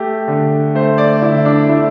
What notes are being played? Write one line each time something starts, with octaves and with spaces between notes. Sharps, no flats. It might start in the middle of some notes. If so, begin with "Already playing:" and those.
Already playing: A3 G4
D3
A3 C5
D5
D3 E4
D4
A3 E4